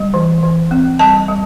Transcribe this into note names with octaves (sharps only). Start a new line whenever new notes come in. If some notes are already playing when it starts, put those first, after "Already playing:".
Already playing: G3
E3
E3
C4
G3 A5
G3